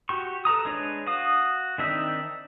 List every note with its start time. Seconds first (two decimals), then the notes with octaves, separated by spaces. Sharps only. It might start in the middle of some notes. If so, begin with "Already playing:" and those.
0.09 F#4 G4 C#6
0.45 A4 B4 A#5 D#6
0.65 G#3 D4 B4 C#5
1.07 F#4 F5 D#6
1.78 D#3 C4 D4 D#4 E5